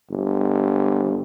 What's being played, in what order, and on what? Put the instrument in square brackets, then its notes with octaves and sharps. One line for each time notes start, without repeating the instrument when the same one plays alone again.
[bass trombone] G1